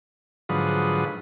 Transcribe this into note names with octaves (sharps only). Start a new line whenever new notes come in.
G#2 D3 F3 F#3 B4 D#6